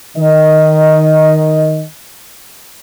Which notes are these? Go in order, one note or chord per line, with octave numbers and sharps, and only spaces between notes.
D#3 D#5